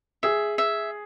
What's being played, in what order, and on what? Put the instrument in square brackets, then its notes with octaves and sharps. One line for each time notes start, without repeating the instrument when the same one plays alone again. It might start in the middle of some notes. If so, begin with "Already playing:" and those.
[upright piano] G#4 [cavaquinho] E5
[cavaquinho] E5